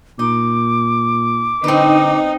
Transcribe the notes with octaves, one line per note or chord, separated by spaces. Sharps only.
A#2 D#4 D6
D3 C4 D#4 B4